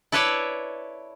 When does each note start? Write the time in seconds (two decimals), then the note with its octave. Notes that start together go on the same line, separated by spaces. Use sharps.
0.12 E4 A4 B4 C#5 D5 E5